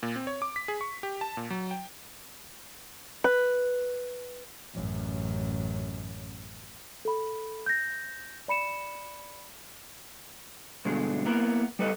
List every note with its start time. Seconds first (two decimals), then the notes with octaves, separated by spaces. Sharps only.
0.03 A#2
0.16 C4
0.27 C#5
0.42 D6
0.56 B6
0.68 G#4
0.81 C#6
1.03 G4
1.21 A5
1.37 A#2
1.50 F#3
1.71 G5
3.24 B4
4.75 A1 F#2
7.05 A4 B5
7.66 G6 A#6
8.48 D5 B5 C#7 E7
10.85 G2 B2 D3 G#3
11.25 A#3 B3 E4 A#4
11.79 G3 A4 B4 D#5